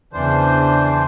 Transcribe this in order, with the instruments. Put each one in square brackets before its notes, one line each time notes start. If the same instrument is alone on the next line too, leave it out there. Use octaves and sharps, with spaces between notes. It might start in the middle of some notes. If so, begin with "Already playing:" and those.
[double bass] E2 C#3 [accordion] E3 D4 C5